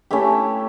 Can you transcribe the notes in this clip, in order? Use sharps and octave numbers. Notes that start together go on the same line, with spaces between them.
A3 C#4 E4 G4